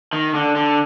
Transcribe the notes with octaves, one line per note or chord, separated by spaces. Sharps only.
D#3
D3
D3